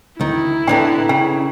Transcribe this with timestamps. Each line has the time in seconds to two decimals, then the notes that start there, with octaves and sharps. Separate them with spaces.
0.21 D2 D#3 E4
0.67 A2 D3 B3 D4 B4 G5 A#5
1.09 C#3 G5